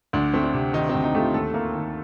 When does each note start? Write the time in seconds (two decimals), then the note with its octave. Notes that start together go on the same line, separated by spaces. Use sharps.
0.13 D2 D4
0.33 A3 C4
0.44 D4
0.53 C3
0.73 D#3 D#4
0.89 C4
0.95 D2
1.04 D#4
1.15 A3 F4 G4
1.34 D#2 A4
1.54 A#3
1.75 D#3